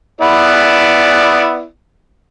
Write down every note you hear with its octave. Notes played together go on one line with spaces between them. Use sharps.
B3 E4 D5